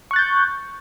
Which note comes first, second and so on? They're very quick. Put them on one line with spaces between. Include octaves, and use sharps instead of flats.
C#6 F#6 A6 G6